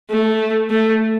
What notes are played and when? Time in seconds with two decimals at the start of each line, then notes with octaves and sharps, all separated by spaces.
0.10 A3
0.70 A3